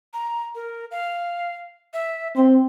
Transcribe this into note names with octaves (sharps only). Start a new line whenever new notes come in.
A#5
A#4
F5
E5
C4 C6